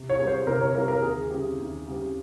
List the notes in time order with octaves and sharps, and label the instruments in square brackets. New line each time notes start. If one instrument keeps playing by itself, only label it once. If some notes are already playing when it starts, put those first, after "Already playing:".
Already playing: [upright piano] C3
[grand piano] C#5
[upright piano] G3 A#3 F4 G#4
[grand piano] C5
[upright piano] C3 [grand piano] A#4
[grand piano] C#5
[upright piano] G3 A#3 F4 G#4 [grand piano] A#4
[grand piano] A#4
[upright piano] D#2 [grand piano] G#4
[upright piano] C#3 G3 C4 G4
D#2
C#3 G3 C4 G4